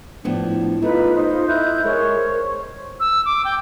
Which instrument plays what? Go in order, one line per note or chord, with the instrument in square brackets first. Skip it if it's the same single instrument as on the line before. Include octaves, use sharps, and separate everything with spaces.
[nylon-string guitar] A2 F3 B3 [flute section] D4
[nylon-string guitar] A3 [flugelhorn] D#4 [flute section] F4 [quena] B4
[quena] D#4 [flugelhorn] C5
[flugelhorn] E4 [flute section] F#6 G6
[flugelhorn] G#3 [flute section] A#4 [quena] C#5
[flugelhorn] C5
[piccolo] E6
D6
G5